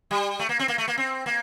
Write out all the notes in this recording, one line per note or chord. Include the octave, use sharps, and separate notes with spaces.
G3
A3
A#3
C4
A#3
A3
A#3
C4
A#3